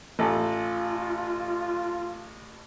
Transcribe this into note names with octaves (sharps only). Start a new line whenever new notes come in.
A1 F4 A4